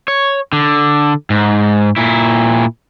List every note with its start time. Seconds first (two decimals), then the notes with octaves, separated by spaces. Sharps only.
0.08 C#5
0.53 D3
1.30 G#2
1.96 A#2 E4